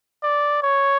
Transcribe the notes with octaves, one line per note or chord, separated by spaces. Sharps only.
D5
C#5